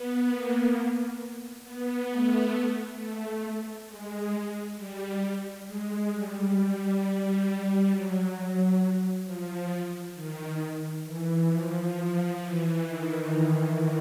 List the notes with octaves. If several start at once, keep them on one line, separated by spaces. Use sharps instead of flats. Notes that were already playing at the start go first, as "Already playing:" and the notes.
Already playing: B3
A#3
B3
A3
A3
G#3
G3
G#3
G3
G3
F#3
F3
D#3
E3
F3
E3
D#3